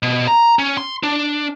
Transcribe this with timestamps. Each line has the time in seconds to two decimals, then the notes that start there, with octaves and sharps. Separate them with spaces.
0.03 B2
0.28 A#5
0.59 C#4
0.77 C6
1.03 D4